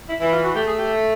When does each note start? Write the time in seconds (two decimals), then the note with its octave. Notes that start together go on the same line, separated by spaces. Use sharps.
0.09 E4
0.20 E3 E4
0.32 F4
0.44 F#4
0.55 A3 G4
0.67 G#4
0.78 G4